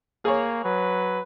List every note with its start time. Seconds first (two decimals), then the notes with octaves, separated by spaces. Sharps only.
0.25 A#3 G#4 C#5
0.64 F#3 B4